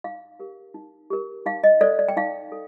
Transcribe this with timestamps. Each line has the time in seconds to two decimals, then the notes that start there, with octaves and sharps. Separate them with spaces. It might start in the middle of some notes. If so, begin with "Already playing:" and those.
0.04 D#4 F5
0.39 G4 A#4
0.74 D#4
1.10 G4 A#4
1.46 D#4 F5
1.64 D#5
1.81 A4 C5 D5
1.99 D5
2.08 G5
2.17 D#4 F5
2.52 A4